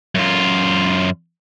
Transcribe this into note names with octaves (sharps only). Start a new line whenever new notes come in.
F#2 F4